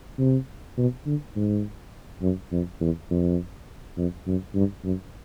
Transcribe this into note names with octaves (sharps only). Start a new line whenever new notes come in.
C3
B2
D3
G#2
F#2
F2
E2
F2
F2
F#2
G2
F#2